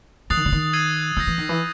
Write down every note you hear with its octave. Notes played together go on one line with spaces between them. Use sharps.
E3 D#6 F#6 A6 C7 F7
D#3
D3
D#3
E6 G#6 C7 D#7
E3 E6 G6 A#6
E3
D#3
E3